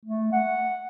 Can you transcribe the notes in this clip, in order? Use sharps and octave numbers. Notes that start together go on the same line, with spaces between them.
A3
F#5